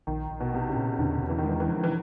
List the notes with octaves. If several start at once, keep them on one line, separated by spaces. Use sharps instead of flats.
A#1 D#3
A#1
B2
C3 B3
C#3
A#2
E2 D3
E2
E3
D#3
E3 G#3
E3
F3
E3